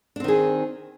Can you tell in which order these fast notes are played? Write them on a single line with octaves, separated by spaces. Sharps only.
D4 C4 D#3 G#4